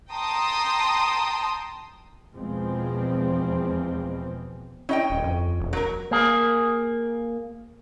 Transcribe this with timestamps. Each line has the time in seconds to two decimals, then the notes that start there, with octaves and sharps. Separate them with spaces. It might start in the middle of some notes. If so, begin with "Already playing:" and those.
0.12 G5 A5 A#5 C6 D#6
2.35 E2 B2 F3 G#3 C4
4.89 C#4 E4 D#5 G5
5.10 D#1
5.24 F2
5.60 E1
5.73 F#3 A#4
6.11 A#3 G#4